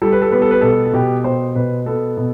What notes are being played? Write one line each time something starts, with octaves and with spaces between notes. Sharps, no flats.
G3 A4
B4
A4
B3 B4
A4
B4
B2 A4
A4
B2 G4
B2 C5
B2 B4
B3 A4
B2